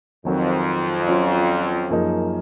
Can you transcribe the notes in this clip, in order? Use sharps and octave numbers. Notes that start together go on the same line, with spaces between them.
F2 D#3 F#3 C4
F#3 C#4 F4
F#2 F3 A#3 D#4 G#4